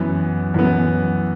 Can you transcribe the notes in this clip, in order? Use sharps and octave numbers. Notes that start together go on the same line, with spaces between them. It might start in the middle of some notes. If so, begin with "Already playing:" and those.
Already playing: F#2 E3 B3
F#2 E3 B3